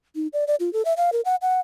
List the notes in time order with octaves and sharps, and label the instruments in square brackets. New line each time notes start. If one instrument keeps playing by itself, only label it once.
[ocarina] D#4
D5
D5
F4
A4
E5
F5
A#4
F#5
F#5